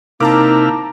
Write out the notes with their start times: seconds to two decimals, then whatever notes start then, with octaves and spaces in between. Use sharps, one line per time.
0.20 C3 A#3 D#4 E4 A5 A#5 D6 F6